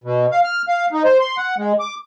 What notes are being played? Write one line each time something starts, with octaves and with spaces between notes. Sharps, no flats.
B2
F5
F6
F5
D#4
C5
C6
F#5
G#3
D6